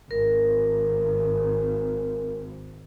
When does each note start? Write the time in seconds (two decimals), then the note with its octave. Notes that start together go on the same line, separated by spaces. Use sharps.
0.11 G#1 A#4